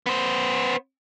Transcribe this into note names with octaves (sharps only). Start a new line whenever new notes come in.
B3 C5